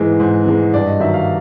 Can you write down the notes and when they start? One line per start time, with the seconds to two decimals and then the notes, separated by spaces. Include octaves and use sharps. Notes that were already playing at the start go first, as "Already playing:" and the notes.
Already playing: G#2 E3 G#3
0.20 G#2
0.46 E3 G#3
0.74 G2 D5
0.87 D#5
1.00 D#3 F#3 E5
1.14 F5